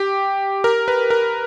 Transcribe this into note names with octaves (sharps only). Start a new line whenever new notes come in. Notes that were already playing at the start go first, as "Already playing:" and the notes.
Already playing: G4
A#4
B4
A#4